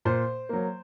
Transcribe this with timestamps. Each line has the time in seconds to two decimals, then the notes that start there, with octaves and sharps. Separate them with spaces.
0.05 A#2 C5
0.49 F#3 A#3